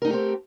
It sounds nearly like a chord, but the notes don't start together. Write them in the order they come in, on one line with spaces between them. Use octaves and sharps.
A#4 D#4 A3 G4 C4